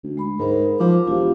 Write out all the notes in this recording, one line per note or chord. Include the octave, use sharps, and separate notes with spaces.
D2
G#3 B5
G#2 A#4 C5
F3 D6
E1 F4 G4 F5